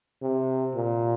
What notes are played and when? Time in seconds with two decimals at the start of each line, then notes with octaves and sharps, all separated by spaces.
0.22 C3
0.75 A#2